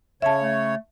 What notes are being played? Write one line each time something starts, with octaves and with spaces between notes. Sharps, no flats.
C#3 C#5 E5 A5
A3